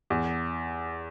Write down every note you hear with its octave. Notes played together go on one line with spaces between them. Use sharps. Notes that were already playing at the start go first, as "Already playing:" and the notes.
E2